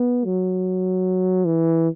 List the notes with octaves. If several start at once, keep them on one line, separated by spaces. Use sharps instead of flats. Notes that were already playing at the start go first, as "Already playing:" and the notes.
Already playing: B3
F#3
E3